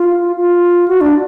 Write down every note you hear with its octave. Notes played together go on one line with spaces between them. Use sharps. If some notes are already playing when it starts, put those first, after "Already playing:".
Already playing: F4
F4
F#4
D4